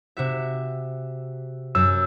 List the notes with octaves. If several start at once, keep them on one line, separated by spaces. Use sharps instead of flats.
C3 F#4 E5
F#2 E6